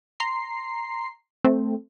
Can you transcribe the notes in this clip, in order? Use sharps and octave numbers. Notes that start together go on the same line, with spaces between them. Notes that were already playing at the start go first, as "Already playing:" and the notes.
A#5 C6 C7
A3 C4